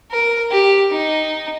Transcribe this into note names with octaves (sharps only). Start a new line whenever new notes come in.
A#4
G4
D#4